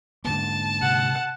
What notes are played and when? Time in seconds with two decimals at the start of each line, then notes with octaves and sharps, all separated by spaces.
0.25 G#2 D3 A#3 A5
0.82 C3 F#5